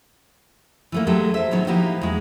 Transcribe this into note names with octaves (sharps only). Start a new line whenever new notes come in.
E3 A3 A#3
F#3 G#3 A3 G4 A4
C5 E5
A2 D#3 F#3 B3 D#4
F3 A#3 D#4 E4 F#4 G4
E2 G#3